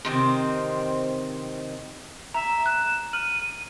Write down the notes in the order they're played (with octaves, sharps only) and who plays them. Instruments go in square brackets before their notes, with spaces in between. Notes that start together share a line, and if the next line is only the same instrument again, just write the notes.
[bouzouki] C3 D#3 C4
[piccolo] E5 [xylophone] A#5
[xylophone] F#6 [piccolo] E7
[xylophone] F6 F#7 [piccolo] D#7